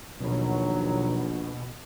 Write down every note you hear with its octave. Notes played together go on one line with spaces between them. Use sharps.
A#1 D#2 B2 F#3